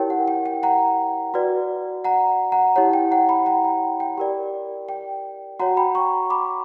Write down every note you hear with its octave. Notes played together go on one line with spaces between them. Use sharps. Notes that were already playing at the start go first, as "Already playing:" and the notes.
Already playing: E4 G4 A#4 C#5 G5
F#5
G5
G5
F#5 A#5
F#4 B4 D5
F#5 A#5
F#5 A#5
E4 G4 C#5 F#5
G5
F#5 A#5
G5 B5
F#5 A#5
G5
G5
G4 A#4 D5
G5
F#4 C#5 F#5 A#5
G5 B5
A#5 C#6
B5 D6